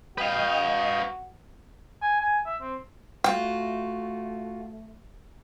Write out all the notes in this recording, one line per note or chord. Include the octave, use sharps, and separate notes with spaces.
F#4 B4 D#5 F5 G5
G#5
G#5
E5
C4
A3 F4 F#4 G5